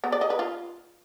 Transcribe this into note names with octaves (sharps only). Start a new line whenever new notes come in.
B3
D5
D#5
B4
F4